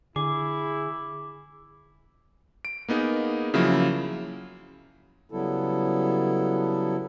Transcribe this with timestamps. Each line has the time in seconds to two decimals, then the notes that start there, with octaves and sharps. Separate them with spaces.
0.16 D3 E4 G#4 D6
2.65 D7
2.88 A#3 B3 D#4 G#4
3.54 C#3 F3 F#3 A#3 E4
5.32 C#3 F#3 G3 B3 E4 A4